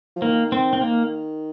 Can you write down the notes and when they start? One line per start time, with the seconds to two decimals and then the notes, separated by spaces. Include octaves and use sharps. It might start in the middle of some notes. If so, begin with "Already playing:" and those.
0.16 F3
0.22 D#3 A#3
0.52 C4
0.73 C4
0.81 A#3